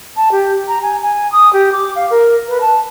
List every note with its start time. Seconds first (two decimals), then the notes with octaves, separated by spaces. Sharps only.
0.17 A5
0.32 G4
0.68 A#5
0.83 G#5
1.02 G#5
1.32 D#6
1.53 G4
1.72 D6
1.96 F5
2.11 A#4
2.49 B4
2.61 A5